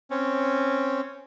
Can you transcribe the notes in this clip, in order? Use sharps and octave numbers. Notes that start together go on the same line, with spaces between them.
C4 C#4